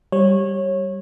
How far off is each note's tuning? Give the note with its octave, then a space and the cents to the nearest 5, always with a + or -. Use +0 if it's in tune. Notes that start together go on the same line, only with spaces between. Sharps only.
G3 +0 C#5 -20